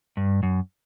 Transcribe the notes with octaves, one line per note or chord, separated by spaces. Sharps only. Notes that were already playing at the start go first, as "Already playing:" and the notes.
G2
F#2